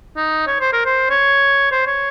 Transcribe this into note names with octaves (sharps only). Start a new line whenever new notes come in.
D#4
C#5
C5
A#4
C5
C#5
C5
C#5